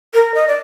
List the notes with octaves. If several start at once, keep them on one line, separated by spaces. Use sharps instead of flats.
A#4
D#5
D5